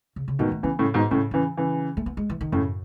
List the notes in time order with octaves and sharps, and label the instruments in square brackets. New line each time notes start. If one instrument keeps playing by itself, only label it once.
[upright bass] C#3
C#3
[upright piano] B2 D#3 [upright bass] A3
[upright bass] A3
[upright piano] C#3 E3 [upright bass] B3
[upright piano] A2 C#3
G#2 B2
[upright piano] A2 C#3 [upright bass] C#4
[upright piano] C#3 E3 [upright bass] C#4
[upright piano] C#3 E3
[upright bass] A3
B3
G#3
E3
D#3
[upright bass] F#2 [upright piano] A2 C#3